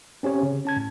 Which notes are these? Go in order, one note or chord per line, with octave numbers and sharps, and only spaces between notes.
C4 C#4 G4 C#5
C#3
C#4 A5 G#6
A2